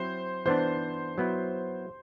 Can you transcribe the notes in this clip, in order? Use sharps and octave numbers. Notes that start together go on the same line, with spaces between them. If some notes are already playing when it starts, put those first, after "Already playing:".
Already playing: F#3 C4 E4 C5
E3 B3 D4 C5
F#3 B3 E4